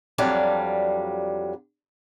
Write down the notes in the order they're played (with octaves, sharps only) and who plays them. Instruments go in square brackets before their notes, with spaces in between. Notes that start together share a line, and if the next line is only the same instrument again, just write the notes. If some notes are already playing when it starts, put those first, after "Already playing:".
[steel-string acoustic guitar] F2 F#3 G3 D4 F5